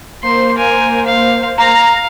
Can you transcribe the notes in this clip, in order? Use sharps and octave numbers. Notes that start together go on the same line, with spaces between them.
A#3 C5 C6
A#4 G#5
F5
F5 A#5